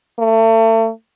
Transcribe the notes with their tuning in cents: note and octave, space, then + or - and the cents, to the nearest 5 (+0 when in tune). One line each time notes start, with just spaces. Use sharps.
A3 +35